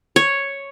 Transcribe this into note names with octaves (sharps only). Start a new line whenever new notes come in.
C#5